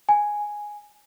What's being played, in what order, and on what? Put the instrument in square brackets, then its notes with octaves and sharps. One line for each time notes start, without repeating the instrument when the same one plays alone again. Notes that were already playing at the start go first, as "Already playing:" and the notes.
[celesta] G#5